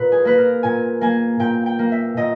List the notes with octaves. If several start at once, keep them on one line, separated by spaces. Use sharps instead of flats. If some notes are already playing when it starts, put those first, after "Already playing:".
Already playing: A#2 B4
G#4
A#3 B4
A#4
A#2 G#5
A#3 G#5
A#2 G5
G5
A#3
E5
A#2 D#5